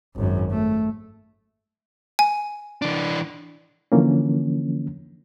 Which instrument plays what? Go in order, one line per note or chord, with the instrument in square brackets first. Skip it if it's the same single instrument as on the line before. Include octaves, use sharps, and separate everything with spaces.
[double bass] G#1 F#2
A3
[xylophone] G#5
[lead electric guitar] E3 D4
[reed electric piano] D3 E3 F3 A#3 C#4